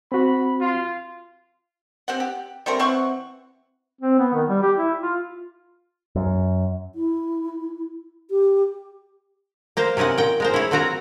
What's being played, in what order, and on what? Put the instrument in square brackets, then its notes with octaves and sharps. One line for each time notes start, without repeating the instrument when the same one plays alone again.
[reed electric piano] C4 F#4 [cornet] B5
[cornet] F4
[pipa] C4 G4 F#5
G4
G3 A3 C4 A#4
E3 C4 F#5 C#6
[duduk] C4
B3
D#3
G3
G4
E4
F4
[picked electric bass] F#2
[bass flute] E4
G4
[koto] A#3 C5 F5
C3 C#4 D#4 A#4 F#5
A#2 G5
G#3 A#4 C5
E4 C#5
A#2 F#3 C4 F#4 A#4 A#5